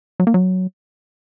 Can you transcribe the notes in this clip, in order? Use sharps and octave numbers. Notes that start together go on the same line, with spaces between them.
F#3
A#3
F#3